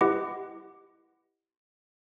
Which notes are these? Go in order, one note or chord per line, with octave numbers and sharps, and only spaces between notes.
E4 G4 B4 D#5 F#5 D6